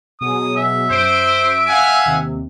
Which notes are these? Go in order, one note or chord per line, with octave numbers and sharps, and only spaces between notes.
B2 F#3 G#4 D#6
E5
F#2 C5 D7
F5 F#5 G#5
D#2 C3